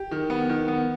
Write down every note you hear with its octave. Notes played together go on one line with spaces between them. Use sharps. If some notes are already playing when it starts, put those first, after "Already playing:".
Already playing: G4
D#3
B3
D#3
B3